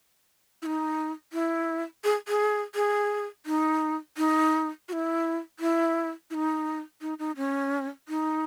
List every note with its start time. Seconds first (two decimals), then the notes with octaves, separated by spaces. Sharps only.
0.62 E4
0.66 D#4
1.33 E4
2.04 G#4
2.28 G#4
2.75 G#4
3.46 D#4
4.18 D#4
4.89 F#4
4.93 E4
5.59 E4
6.30 E4
6.34 D#4
7.01 D#4
7.19 D#4
7.37 C#4
8.09 D#4